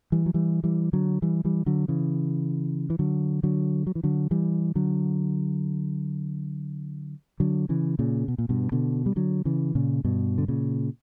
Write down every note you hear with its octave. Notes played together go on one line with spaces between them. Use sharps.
E3 G3
F#3
E3 G3
E3 G3
D3 F#3
E3 G3
E3 G3
D3 F#3
C#3 E3
E3
D3 F#3
D3 F#3
F#3
E3
D3 F#3
E3 G3
D3 F#3
D3 F#3
C#3 E3
A#2 C#3
B2
A#2
G2 B2
B2 D3
G3
D3 F#3
C#3 E3
A#2 C#3
G2 B2
D3
A#2 C#3